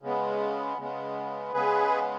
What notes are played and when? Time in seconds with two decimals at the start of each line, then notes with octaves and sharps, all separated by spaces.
0.02 C#3 G#3 B3
0.78 C#3 G#3 B3
1.54 C#3 G#3 B3 G#4 B4